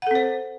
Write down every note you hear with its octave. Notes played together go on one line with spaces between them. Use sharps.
C4 A4 C5 F#5